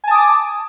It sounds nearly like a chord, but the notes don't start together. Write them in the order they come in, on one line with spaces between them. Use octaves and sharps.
G#5 A5 D#6 D6